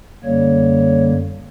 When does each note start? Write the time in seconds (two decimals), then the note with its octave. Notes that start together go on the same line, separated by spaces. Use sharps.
0.24 F#2 D3 G3 A#3 C#5